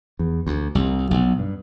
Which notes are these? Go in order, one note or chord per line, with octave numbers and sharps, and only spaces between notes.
E2
D2
C2
B1
G2